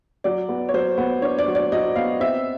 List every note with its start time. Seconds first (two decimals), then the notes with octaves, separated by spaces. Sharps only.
0.24 F#3 D5
0.49 B3
0.69 C#5
0.74 F#3 C5
0.98 B3
1.22 D4 C#5
1.39 D5
1.48 F#3
1.55 D5
1.72 F#3 D#5
1.96 B3 F5
2.20 C4 E5